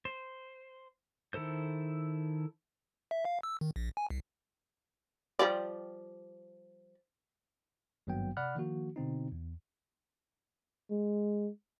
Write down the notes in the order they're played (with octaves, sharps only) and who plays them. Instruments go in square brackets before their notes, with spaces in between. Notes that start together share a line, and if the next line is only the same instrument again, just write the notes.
[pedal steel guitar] C5
D#3 E4 A4 C5 G6
[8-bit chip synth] E5
F5
E6
D#3
A#1
G#5
C2
[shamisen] F3 G3 D5
[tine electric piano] G#1 G2 F#3 A#3 B3 G5
C3 D5 F#5 B5 F6 F#6
D#3 F3 A#3 F#4
B2 D3 C4 D#4
E2
[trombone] G#3